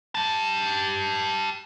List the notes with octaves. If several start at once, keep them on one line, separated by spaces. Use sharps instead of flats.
G4 A5